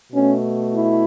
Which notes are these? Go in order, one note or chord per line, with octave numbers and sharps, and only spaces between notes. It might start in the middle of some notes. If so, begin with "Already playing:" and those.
B2 A3 C#4
E4